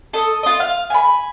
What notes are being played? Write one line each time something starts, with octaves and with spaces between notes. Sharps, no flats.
A4 D#5
F4 D#5
F5
G#5 B5